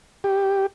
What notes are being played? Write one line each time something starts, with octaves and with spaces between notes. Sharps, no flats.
G4